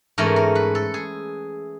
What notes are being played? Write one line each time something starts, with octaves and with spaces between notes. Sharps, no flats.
G#2 E3 A3 C#4 A#4
A#4
B4
A4
G#4